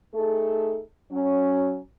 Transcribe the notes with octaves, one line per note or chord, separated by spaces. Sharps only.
A3 D#4 G#4 A4
F#3 C#4